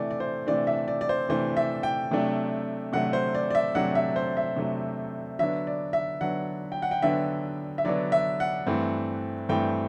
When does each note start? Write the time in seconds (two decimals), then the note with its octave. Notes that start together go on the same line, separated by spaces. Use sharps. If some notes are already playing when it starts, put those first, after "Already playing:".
Already playing: C3 E3 A3 D4 D5
0.11 D5
0.20 C5
0.47 C3 E3 A3 D4 D5
0.67 E5
0.88 D5
1.01 D5
1.09 C5
1.29 C3 E3 A3 D4 C5
1.57 E5
1.83 G5
2.11 C3 F#3 A3 D4
2.93 C3 F#3 A3 D4 F#5
3.13 C5
3.35 D5
3.50 D5
3.55 E5
3.75 C3 F#3 A3 D4 F#5
3.95 E5
4.16 C5
4.37 E5
4.56 C3 F#3 A3 D4
5.39 D3 F#3 B3 D4 E5
5.67 D5
5.93 E5
6.21 D3 F#3 B3 D4 F#5
6.72 G5
6.82 F#5
6.91 G5
7.02 D3 F#3 B3 D4 E5
7.78 E5
7.84 D3 F#3 B3 D4 D5
8.12 E5
8.40 F#5
8.67 G2 E3 A3 C4
9.49 G2 E3 A3 C4 G5